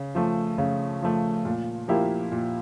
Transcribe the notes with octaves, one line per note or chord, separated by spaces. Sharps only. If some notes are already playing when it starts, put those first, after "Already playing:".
Already playing: C#3
F3 A3
C#3
F3 A3
A#2
F3 A#3 E4 G4
A#2